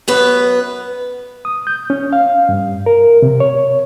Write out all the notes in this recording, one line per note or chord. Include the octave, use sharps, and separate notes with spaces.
F#2 B3 B4
D#6
G6
C#4
F5
G2
A#4
C3
C#5